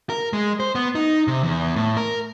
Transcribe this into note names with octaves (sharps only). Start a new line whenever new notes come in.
A#4
G#3
C5
B3
D#4
C3
E2
A2
A#4